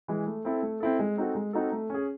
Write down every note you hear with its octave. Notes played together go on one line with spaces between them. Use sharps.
E3 G#3
A3
C4 E4 A4
A3
C4 E4 A4
G#3
C4 D#4 F#4 A4
G#3
C4 D#4 F#4 A4
A3
C#4 G#4